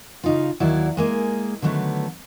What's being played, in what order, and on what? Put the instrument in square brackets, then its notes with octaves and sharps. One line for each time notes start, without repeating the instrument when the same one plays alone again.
[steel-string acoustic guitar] C#3 D#4 F4
D#2 F#3 E4 D5 F#5
G#3 A#3 G#4
D3 D#3 F#3 A3 B3